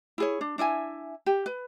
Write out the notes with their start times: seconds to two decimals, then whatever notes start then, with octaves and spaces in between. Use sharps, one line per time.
0.18 E4 G#4 C#5
0.41 D4
0.58 D4 E4 E5 G#5
1.26 G4
1.46 B4